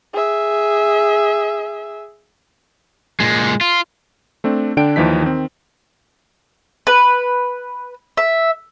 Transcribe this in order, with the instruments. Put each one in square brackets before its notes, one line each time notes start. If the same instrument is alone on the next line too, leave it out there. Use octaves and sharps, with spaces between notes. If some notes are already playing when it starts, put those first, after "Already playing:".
[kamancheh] G#4 E5
[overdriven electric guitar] A#2 G#3
F4
[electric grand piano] A3 C4 D4
D3 D4 G5 D7
D#2 E3 F3 D#4 B6
D#3 C4
[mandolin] B4
E5